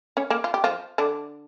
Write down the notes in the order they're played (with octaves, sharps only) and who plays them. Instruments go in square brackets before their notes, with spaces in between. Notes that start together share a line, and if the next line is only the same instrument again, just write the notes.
[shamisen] C#4 C#5
A#3 A#4
F4
G4
F3 F4
D3 D4